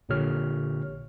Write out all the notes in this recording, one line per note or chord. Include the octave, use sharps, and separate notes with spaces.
A#1 A#2 D3 G4 C#5 F6